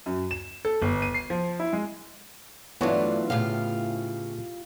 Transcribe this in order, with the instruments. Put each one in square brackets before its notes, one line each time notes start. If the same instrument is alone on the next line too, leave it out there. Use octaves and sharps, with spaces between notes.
[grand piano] F#2
E7
A4
G1
D#7
C7
F3
E4
G#3
[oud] G2 A3 D4 [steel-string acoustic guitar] E3 F#3 F4 [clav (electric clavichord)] B3 C#5
[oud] A2 C#3 [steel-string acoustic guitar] F4 G4 F5